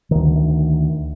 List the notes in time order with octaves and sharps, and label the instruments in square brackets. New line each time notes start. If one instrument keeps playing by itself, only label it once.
[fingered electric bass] D2 D#3